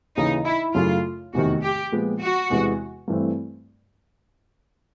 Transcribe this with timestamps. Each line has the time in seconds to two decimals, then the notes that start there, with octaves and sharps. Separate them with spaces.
0.17 D#2 C#3 E3 D#4
0.46 E4
0.75 F#2 C#3 F#3 A3 F4
1.34 F1 E2 C3 D#3 F#4
1.63 G4
1.92 A#2 F3 G#3 B3
2.21 F#4
2.50 E2 C3 E3 G#3 B3
3.08 G2 E3 A3 C4